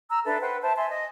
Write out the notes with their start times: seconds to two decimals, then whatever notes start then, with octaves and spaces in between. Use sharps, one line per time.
0.10 A#5 E6 F6
0.26 D4 A4 B4 E5
0.41 B4 C5 F#5 G5
0.62 C5 E5 G5 A5
0.76 E5 G#5 A5 C6
0.90 D#5